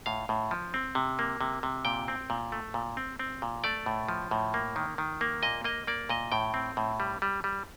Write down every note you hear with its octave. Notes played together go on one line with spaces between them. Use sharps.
A2 F5
A2
F3
C4
C3
A#3
C3
C3
A#2 G5
C4
A#2
A3
A#2
C4
C4
A#2
A3 D5
A2
F3
A2
A#3
D#3
D#3
A#3
A#2 D#5
A#3 D#5
A#3 D5
A#2 D#5
A2 G5
C4
A2
G3
G3
G3